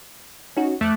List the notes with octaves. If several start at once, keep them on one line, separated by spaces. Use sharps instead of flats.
C#4 D#4 F#4
F2 A3 D6 F#6